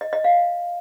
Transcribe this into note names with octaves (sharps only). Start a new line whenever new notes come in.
D#5
D#5
F5